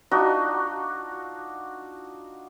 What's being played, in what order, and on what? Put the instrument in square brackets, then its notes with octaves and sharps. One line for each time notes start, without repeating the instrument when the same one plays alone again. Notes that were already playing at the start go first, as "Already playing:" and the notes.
[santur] D4 D#4 F4 F#4